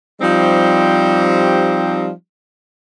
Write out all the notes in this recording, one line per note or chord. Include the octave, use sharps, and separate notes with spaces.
F3 G3 C4 D#4 G4